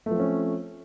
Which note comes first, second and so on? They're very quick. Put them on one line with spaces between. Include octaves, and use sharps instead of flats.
A3 F3 C4 C#4